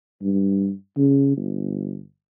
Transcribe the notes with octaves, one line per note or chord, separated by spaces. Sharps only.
G2
C#3
G1